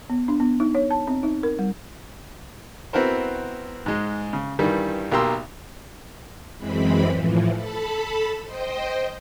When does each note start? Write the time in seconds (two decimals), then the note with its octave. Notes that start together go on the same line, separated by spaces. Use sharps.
0.10 B3
0.28 D4
0.40 B3
0.60 D#4
0.75 C#5
0.91 A5
1.07 C4
1.23 D#4
1.43 A#4
1.59 G3
2.93 B3 C4 E4 F#4 A#4 C5
3.86 G#2 G#3
4.33 C#3
4.59 G2 D#3 E3 G3
5.11 B1 A#3 G4 A#5 C6 E6
6.58 F#2 E3 G#3 C4 B5
7.12 A2 E3 F3
7.55 A4 A5 B5
8.44 C5 D#5 G5